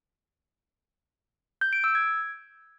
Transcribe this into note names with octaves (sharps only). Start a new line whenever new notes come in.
G6
D7
E6
G#6